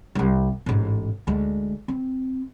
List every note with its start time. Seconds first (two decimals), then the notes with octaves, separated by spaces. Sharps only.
0.15 C2 G3
0.66 A1 G#2
1.27 D2 G#3
1.88 C4